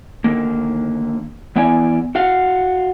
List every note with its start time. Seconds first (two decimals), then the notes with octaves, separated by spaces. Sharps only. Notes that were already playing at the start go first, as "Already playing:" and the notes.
0.24 D3 D#3 A#3
1.56 E3 B3 E4 D5 G#5
2.15 F#4 F5 F#5